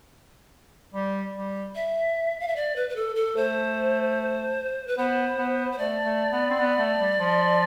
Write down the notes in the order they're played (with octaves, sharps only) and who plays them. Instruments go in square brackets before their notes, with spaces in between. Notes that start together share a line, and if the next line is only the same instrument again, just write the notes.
[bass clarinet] G3
G3
[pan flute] E5
F5
E5
D5
B4
B4
A4
A4
[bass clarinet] A3 [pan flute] C5
[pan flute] B4
[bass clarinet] B3 [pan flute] C5
[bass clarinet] B3
[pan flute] C5
[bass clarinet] A3 [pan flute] D5
[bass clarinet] A3
B3
C4
B3
A3
G3
F3